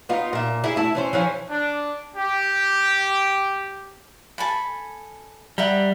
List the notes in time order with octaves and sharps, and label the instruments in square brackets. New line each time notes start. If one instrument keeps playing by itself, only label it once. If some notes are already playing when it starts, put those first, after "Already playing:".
[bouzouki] B3 D#4 F4
A#2 E5
E4 G#4 E5
A3 E4 A5
E3 C#4 C5
E3 F3 C#4
[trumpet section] D4
G4
[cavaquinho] A4 G#5 B5
[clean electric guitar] G3 [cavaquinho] E5 F#5 A#5